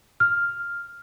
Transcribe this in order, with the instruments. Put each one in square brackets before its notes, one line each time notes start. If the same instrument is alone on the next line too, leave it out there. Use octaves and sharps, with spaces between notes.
[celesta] F6